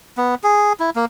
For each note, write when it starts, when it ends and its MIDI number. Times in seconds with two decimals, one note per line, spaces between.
0.17 0.35 59
0.44 0.73 68
0.80 0.90 64
0.96 1.05 58